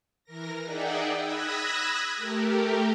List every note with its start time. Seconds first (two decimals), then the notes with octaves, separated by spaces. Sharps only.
0.24 E3 A#4 A#6
0.63 D#4 G#4 D5 E5 F#5 G5
1.16 B5 D#6 E6 F#6 G#6 A#6
2.16 A3 G4 A#4